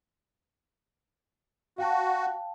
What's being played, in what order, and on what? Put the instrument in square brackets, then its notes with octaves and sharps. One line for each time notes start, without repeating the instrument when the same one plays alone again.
[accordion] F#4 [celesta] F5 G5 A5